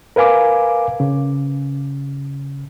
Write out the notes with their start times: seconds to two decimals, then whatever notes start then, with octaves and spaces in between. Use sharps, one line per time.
0.16 A#4 B4 F5 G#5 D6
1.00 C#3